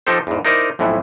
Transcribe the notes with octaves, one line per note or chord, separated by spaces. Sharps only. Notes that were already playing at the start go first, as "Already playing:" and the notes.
F3 D#4 G4 A4 C5
E2 G#2
D#4 E4 A#4 C5 D5 D#5
B1 F2 A2 E3